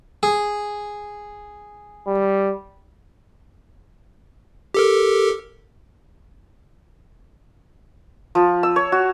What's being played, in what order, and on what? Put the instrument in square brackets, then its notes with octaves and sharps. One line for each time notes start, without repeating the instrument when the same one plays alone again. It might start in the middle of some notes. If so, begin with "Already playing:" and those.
[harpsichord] G#4
[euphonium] G3
[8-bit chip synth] G4 A4 A#4
[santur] F3
E6
C#5
F#4